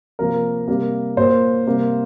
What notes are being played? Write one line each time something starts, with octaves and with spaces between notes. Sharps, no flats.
C3 F3 A#3 A#4
C3 G3 A#3
A#2 A#3 C5
C3 G3 A#3